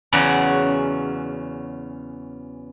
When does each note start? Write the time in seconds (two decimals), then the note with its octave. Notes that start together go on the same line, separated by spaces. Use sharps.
0.13 E2 C#3 F#3 C#4 F#4 D5